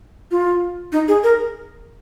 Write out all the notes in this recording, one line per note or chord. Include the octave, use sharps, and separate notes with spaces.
F4
D#4
G#4
A#4